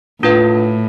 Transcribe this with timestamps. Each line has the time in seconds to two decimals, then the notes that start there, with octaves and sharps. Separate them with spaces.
0.22 A2 D4 F4 B4 F5